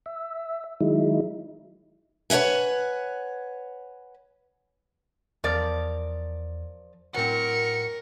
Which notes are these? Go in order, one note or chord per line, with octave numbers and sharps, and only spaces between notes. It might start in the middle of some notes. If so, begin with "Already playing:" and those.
E5
D#3 F#3 G#3 D#4 E4
B4 C#5 F5 F#5 G#5
E2 F3 A#4 D5
A2 F#3 C4 A#4 F#5 C#7